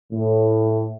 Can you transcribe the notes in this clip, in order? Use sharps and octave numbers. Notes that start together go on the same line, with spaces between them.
A2